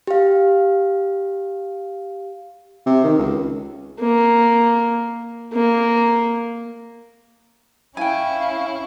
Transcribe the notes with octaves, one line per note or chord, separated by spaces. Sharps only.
G4 F5
C3
D#3
C#2
A#3
A#3
C#4 E4 F5 G5 G#5